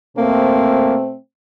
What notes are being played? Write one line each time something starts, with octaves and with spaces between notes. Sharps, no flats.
B2 A3 A#3 C4